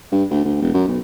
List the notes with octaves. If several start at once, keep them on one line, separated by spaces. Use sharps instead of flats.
G2
D2
D2
E1
F#2
B1